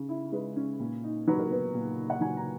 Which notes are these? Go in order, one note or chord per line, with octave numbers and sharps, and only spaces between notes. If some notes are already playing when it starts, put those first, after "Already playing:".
Already playing: C#3
E4
G#3 B4
C#4
A#2
D#4
F#3 B4
A#4
B3 B4
A#2
D#4
F#5
F#3 G#5
A#5